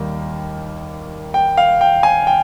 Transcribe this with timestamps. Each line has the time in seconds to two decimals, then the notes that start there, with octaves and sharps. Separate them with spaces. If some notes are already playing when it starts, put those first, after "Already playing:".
Already playing: D#2 D#3 G3 A#3
1.34 G5
1.58 F5
1.81 G5
2.03 G#5
2.27 G5